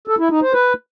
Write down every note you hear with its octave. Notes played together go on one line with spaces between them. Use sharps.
A4
E4
D#4
C5
B4